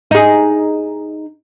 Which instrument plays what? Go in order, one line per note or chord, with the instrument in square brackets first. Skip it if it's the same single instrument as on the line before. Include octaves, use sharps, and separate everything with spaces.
[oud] D#4 G#4